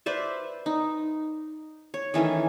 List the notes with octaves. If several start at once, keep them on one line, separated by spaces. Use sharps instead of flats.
B4 C5 D5 E5
D#4
C#5
D#3 E3 A3 C#4